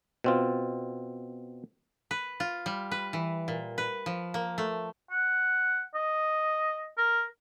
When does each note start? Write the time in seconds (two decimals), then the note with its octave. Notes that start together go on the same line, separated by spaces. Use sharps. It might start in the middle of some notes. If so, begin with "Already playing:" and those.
0.24 B2 C4 F4
2.11 B4
2.40 F4
2.66 G3
2.91 B4
3.13 E3
3.48 A#2
3.78 B4
4.06 F3
4.34 A#3
4.58 A3
5.11 F#5
5.94 D#5
6.98 A#4